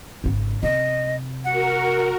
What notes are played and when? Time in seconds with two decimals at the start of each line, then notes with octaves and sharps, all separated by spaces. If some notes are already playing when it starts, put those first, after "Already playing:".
0.24 G#1 C#3
0.63 C3 D#5
1.45 F#4 A#4 F#5